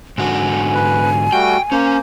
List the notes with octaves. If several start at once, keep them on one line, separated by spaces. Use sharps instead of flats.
G#2 D3 F#4 G#5
B4
G3 A3 F#4 G5
A#3 C#4 C5